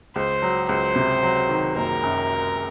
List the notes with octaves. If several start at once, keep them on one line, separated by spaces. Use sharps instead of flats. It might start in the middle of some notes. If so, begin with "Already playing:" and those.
C#2 C5
F#3
C#2 C5
C3
F#3
D#3
F#1 A#4
F#2